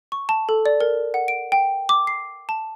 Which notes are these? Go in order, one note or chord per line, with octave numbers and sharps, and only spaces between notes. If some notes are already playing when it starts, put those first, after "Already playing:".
C#6
A5
A4
D5
A#4
F#5
D7
G5
D6
C7
A5